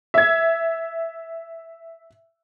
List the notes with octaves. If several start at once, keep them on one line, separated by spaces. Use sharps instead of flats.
E5 G#6